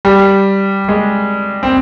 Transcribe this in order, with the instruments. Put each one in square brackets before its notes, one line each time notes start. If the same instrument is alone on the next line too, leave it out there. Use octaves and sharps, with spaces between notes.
[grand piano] G3
G#3
C4